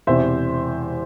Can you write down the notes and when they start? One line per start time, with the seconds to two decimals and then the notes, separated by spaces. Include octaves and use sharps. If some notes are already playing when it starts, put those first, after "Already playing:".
0.07 E1 E2 C3 E3 C5 E5